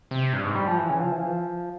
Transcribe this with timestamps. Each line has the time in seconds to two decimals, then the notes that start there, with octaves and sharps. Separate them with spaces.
0.11 C3
0.33 G2
0.44 G#2
0.55 G3
0.67 F3
0.79 E3
0.89 C#3
1.00 F3
1.12 E3
1.22 F3